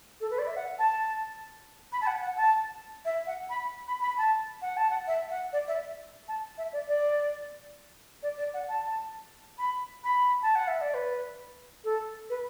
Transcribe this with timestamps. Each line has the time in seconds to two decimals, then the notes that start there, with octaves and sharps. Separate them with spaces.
0.20 A4
0.30 B4
0.38 D5
0.46 E5
0.56 F#5
0.78 A5
1.92 B5
2.01 A5
2.06 F#5
2.22 F#5
2.36 A5
3.04 E5
3.26 F#5
3.49 B5
3.87 B5
4.01 B5
4.17 A5
4.61 F#5
4.76 A5
4.90 F#5
5.07 E5
5.30 F#5
5.52 D5
5.67 E5
6.28 A5
6.57 E5
6.72 D5
6.88 D5
8.22 D5
8.37 D5
8.53 F#5
8.68 A5
9.58 B5
10.03 B5
10.42 A5
10.55 F#5
10.67 E5
10.80 D5
10.93 B4
11.84 A4
12.29 B4